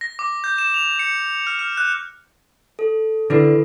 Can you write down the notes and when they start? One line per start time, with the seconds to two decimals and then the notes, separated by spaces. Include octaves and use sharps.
0.01 A#6
0.19 D6
0.44 G6
0.58 E7
0.74 F7
0.99 C#7
1.47 F6
1.59 F6
1.77 F#6
2.79 A4
3.30 D3 E4 A4 B4